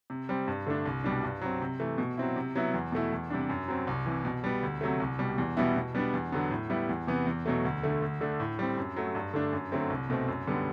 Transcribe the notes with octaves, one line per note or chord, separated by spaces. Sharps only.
C3
G3 C4
G2
D3 A3 D4
C2
B2 G3 D4
G2
F#3 C4
C3
E3 A3
B2
F#3 C4 E4
C3
F#3 B3 E4
E2
B2 A3 E4
E2
C3 G3 D4
F#2
F#3 C4
C2
C3 E3
B2
G3 B3
D2
C3 F#3 A3
C2
B2 G3
E2
B2 G3 B3 E4
B2
G3 B3 D4
E2
D3 F#3 B3
A2
G3 B3 E4
E2
C3 E3 B3
E2
B2 F#3 A3
D2
D3 A3
D2
D3 A3 D4
A2
G3 C4
F#2
F#3 A3
G2
D3 A3 D4
F#2
D3 F#3 A3 C4
C2
B2 A3 C4
F#2
D3 G3 B3